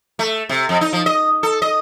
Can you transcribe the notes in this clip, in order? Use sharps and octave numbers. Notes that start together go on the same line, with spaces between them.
A3
C3
F2
D#4
F3
D#5
A4
D#5